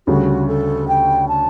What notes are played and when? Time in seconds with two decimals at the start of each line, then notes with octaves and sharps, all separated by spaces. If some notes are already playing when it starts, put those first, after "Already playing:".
0.07 D2 C#3 G3 F#4
0.47 A4
0.88 G5
1.28 A5